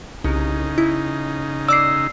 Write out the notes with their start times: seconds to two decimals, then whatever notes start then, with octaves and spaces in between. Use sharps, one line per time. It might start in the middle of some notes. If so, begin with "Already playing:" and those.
0.24 C2 C#3 D#4
0.78 E4
1.69 D5 D6 E6 C7